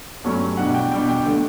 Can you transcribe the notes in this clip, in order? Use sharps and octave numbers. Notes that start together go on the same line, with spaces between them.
G2 F#3 A3 C#4
E2 B2 G3 D4 F#5
G5
E2 B2 G3 D4 G5
G5
D3 A3 D4